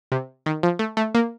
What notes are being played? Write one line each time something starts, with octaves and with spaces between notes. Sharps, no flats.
C3
D#3
F3
A3
A3
A#3